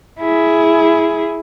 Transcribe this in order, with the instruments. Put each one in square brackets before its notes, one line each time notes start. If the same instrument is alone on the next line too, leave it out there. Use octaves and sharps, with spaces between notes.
[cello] E4 G#4